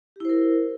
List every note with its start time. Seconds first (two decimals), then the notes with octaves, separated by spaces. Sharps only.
0.16 G4
0.20 E4
0.25 C5
0.29 A#4